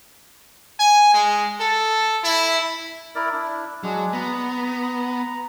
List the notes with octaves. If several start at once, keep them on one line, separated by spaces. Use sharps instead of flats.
G#5
G#3
A4
E4
E4 A#4 D5
D4 E4
F#3 G#3 D4
B3 A#5